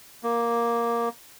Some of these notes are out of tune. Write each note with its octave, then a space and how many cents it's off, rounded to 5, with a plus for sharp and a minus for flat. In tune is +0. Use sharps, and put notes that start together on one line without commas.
A#3 +5